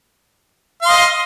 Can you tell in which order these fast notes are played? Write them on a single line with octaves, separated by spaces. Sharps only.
F5 C6 D#5